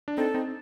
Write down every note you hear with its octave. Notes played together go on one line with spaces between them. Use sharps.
D4
C4 D#4 A4
C4 D#4